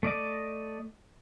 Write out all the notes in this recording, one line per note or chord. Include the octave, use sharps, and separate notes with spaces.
A3 D5 D#5 D6